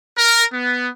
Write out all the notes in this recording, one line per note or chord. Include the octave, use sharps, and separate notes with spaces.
A#4
B3